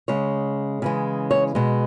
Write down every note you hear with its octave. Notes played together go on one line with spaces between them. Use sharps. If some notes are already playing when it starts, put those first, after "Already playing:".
C#3 G#3 C#5
C#3 E3 G#3
C#5
B2 G#3